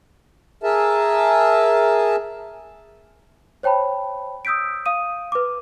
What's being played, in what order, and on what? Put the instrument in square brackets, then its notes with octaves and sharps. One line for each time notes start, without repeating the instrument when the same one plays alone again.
[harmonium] G#4 A#4 E5 A5
[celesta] C5 C#5 G5 A5 B5
D#6 E6 G6 B6 D7
F5 D#6 D#7
B4 D6